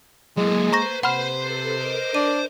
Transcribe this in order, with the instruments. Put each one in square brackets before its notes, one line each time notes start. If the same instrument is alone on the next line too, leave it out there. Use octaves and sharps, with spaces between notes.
[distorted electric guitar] F#3 E4 [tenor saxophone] G#3 [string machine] A#3 A4 G#5
[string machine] B4 [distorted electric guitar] C5 [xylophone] A#5 C#6 A#6
[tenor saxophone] C3 [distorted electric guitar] C5 C6 [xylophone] F#5 B5 F6
[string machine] A4 B4
A#4 D#5 D6
[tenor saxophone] D4 [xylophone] D#7